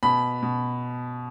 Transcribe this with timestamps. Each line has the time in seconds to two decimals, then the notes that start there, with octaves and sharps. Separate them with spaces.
0.03 B2 B5
0.42 B2